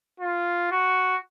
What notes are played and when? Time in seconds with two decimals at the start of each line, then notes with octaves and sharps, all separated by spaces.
0.20 F4
0.71 F#4